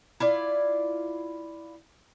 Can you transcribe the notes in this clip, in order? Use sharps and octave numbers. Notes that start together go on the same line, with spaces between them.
E4 F4 D5